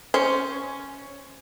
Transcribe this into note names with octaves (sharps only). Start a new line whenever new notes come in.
C#4 C5